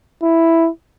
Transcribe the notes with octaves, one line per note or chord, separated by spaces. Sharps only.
E4